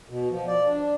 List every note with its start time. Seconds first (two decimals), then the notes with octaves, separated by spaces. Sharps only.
0.09 B2
0.31 F3
0.47 D5
0.67 D4